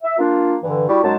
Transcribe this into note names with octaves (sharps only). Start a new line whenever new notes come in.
E5
A#3 D4 F4
G2 D3 E3
G3 E4 F#4
F#2 F#3 G#3 D#4 A5